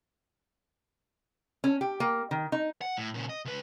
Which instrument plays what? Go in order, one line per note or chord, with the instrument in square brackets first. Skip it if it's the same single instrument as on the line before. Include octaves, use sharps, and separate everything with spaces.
[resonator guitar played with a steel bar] C#4
G4
A#3
D#3
D#4
[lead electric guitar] F#5
A2
A#2 C#3
D#5
C#2 B4